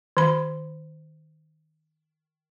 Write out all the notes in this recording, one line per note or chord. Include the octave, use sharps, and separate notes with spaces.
D#3 B5